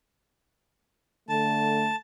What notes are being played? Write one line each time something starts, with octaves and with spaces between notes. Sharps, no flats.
D3 A3 A5